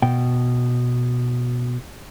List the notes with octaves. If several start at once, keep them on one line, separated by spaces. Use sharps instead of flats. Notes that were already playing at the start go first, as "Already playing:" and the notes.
B2 G5